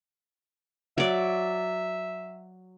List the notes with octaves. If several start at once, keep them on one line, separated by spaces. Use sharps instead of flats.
F#3 D5 E5